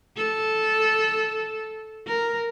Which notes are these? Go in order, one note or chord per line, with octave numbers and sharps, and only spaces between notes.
A4
A#4